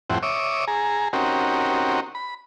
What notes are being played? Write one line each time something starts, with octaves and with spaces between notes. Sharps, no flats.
F2 A2 C4 E4 G4 F#5
C#5 E5 D6 D#6
G#4 A#5
C4 C#4 D#4 F#4 G4 A#4
B5